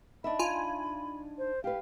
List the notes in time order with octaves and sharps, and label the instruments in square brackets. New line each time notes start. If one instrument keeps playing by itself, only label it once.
[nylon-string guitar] D4 D#4 E5 [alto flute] B5
[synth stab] F4 G#5
[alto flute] C5
[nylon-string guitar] G4 B4 [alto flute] F5